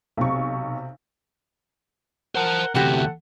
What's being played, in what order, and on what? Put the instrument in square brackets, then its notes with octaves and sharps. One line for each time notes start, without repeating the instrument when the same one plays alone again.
[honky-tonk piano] B1 C#6 [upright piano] C3
[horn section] A#4 F#5 [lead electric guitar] C5 A5
[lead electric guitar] D2 C3 [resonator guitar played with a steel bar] E3 F#4 G4 [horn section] A4 F#5